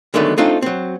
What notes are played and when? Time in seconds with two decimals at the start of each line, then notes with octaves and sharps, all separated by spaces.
0.14 D3 D#3 F#3 G#3 A3 B3
0.37 A3 C4 D4 D#4 F4 A4
0.62 F#3 C4